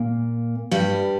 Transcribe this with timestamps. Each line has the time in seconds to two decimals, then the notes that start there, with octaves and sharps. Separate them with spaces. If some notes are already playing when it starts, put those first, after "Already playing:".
Already playing: A#2 A#3
0.71 G2 G3